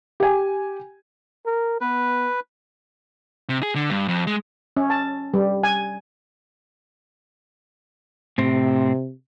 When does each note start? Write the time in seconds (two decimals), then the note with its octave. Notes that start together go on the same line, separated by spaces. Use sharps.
0.20 G4 G#5
1.46 A#4
1.81 B3 B4
3.49 C3
3.63 G#4
3.75 D3
3.90 G2
4.08 F2
4.27 G#3
4.77 C#4
4.90 A5
5.34 G3
5.63 G#5
8.38 A2 C3 C4